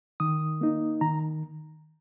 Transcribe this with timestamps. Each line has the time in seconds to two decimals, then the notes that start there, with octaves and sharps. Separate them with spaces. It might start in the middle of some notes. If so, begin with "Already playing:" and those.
0.20 D#3 D#6
0.61 A#3 D#4
1.01 D#3 A#5